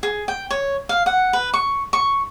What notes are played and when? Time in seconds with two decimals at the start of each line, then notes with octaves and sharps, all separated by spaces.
0.03 G#4
0.28 G5
0.50 C#5
0.89 F5
1.06 F#5
1.33 B4
1.53 C#6
1.93 C#6